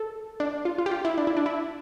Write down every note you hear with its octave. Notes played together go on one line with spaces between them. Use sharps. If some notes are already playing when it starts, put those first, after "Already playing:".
Already playing: A4
D4
F4
F4
G4
F4
E4
D4
E4
D4
E4